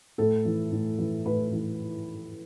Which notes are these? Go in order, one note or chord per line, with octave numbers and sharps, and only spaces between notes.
A2 A4
E3
A2
E3
A2 B4
E3